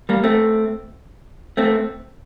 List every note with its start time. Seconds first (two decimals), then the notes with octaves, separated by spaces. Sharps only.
0.09 G3 A#3
0.24 A3 C4
1.57 A3 C4